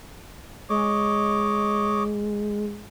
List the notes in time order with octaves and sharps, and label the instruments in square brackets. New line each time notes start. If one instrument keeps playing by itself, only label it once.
[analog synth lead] G#3 [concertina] C#5 D#5 D6